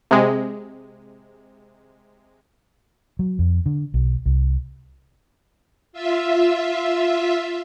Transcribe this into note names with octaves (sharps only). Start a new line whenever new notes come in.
C3 G#3
F#3
F2
D3
B1
C2
F4 E5